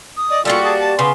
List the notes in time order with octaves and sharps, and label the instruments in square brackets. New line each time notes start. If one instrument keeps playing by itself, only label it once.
[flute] D#6
[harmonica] D5 D#5
[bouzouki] G3 A#3 F#4 [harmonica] F4 A4 [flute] D5
[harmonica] G#4 A5
A5
[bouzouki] C#3 [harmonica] B3 C6